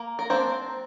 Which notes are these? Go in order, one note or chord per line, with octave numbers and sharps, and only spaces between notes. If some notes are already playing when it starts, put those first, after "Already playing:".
Already playing: A#3
A#4
A#3 C4 D4 C5